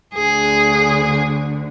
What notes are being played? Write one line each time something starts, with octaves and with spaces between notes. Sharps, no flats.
D2 D3 G#4